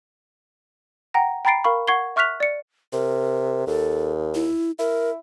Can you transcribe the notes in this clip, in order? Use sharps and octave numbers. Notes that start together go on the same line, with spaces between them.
F#5 G5 A#5 A#6
G5 A#5 B5 A6 C7 D7
A#4 F5 B5 C#6
F#5 C#6 G#6 C7 G7
E5 C#6 F6 F#6 B6 F7
D5 C#7
C3 A#4
D#2 A4
E4
E4 A#4